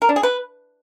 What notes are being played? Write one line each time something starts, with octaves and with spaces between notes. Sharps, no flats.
A#4
D4
G#4
B4